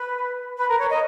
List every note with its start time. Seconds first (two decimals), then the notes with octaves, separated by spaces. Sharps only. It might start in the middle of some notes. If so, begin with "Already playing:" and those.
Already playing: B4
0.57 B4
0.68 A#4
0.78 C#5
0.90 D#5